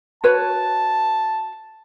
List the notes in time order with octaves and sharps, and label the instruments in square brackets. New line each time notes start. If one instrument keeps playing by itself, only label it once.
[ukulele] F#4 B4 C#5 [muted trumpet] A5